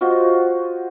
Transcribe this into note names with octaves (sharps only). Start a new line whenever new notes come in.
F4 F#4 C5 D#5